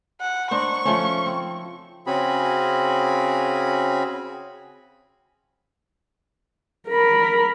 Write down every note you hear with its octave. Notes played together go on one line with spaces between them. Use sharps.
F#5
D4 D#4 C5 C#6
F3 A3 C#4
C4
C#3 C4 C#4 F#4 G#4 B5
A#4 B5